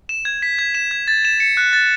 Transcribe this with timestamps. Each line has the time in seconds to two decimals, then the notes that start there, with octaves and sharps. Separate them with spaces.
0.09 E7
0.25 G#6
0.42 B6
0.59 G#6
0.75 E7
0.91 G#6
1.08 A6
1.25 E7
1.40 C#7
1.57 F#6
1.73 A6